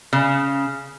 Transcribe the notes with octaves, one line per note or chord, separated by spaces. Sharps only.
C#3